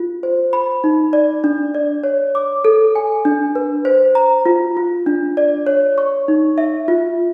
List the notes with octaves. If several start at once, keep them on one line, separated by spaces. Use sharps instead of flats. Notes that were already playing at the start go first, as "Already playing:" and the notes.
Already playing: F4
C5
B5
D#4
D5
D4
D5
C#5
D6
A4
G#5
D4
B4
C5
A#5
F4
F4
D4
D5
C#5
C#6
D#4
E5
F4